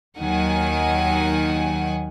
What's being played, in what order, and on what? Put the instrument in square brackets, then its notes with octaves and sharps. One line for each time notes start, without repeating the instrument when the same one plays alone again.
[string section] D#2 D#3 F#3 F#5 G#5